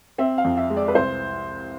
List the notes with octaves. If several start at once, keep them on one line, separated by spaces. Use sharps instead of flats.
C4 E5
F5
F2
E5
G#3
D5
B4
C2 C5